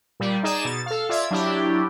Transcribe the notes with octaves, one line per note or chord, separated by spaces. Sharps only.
A#2 G3
D#4 G#4 D5 E7
B2 A6
A4 F5
F4 D5 E5 G#6
F#3 D4 E4 G4